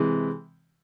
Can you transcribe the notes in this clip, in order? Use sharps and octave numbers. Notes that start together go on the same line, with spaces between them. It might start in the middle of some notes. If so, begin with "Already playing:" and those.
Already playing: C3 E3 G#3